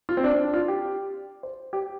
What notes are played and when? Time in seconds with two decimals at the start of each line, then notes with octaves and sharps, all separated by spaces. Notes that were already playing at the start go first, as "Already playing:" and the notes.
0.09 F4
0.17 C4
0.24 D4
0.34 C4
0.44 D4
0.54 F4
0.68 G4
1.43 C5
1.73 G4